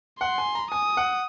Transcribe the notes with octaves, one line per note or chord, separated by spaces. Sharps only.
F#5 C6
G#5
A#5
G#5 D#6
F#5